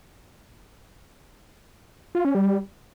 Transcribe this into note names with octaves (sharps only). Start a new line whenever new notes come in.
F4
C#4
G3